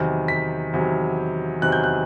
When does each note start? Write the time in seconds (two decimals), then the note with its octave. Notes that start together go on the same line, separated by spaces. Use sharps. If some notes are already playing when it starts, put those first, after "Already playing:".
Already playing: E2 C3 D#3 F#3
0.28 B6
0.73 E2 C3 D#3 F#3
1.62 E2 C3 D#3 F#3 F#6
1.72 G6
1.84 F#6